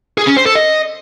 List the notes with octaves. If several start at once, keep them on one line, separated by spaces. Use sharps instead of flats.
G#4
C#4
C5
A4
D#5